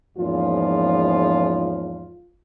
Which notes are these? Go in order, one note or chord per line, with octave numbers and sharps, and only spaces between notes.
E2 G#2 F3 A#3 C#4 F4